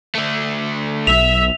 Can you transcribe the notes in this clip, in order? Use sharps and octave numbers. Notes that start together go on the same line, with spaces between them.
D3 A3
B1 E5 F7